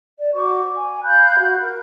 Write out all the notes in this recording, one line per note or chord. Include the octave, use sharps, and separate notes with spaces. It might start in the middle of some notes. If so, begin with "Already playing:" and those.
D5
F#4 C5 C#6 D6
G#5
F5 B5 F#6 G6
F#4
A#4